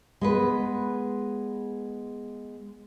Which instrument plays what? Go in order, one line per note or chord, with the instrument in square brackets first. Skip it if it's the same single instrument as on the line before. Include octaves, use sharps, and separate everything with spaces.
[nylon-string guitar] G#3 B3 B4